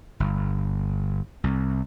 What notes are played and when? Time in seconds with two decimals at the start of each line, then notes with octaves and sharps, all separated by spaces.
0.20 G1
1.44 C2